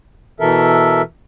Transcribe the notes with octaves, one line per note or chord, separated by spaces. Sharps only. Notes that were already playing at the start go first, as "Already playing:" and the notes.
B2 E3 A4 A#4 E5